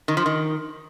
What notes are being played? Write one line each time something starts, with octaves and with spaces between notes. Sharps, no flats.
D#3
F3
D#3